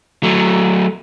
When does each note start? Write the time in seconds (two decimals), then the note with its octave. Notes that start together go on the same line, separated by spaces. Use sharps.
0.23 F#3 A3